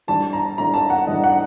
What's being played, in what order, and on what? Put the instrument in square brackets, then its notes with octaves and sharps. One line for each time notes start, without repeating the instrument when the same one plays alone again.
[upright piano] A2 G3 D4 A5
A#5
A2 G3 D4 A#5
A5
F#5
A2 G3 D4 D#5
F#5